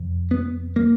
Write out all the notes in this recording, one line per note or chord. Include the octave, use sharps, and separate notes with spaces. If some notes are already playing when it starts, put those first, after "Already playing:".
Already playing: F2 C3
B3
A#3